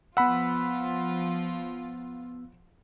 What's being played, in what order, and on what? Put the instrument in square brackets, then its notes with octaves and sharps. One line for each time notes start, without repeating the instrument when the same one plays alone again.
[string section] F3 F4 [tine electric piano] B3 E6 [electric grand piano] F#5 B5